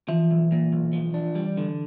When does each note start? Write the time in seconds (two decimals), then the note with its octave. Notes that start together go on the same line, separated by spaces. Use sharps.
0.09 E3 F3
0.31 B1
0.52 A#2
0.72 B1
0.93 F3
1.14 D4
1.35 G3
1.57 D3